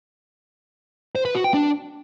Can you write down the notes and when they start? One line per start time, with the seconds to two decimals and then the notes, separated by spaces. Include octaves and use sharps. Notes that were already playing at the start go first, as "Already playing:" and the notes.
1.15 C5
1.25 B4
1.35 F#4
1.44 G5
1.54 D4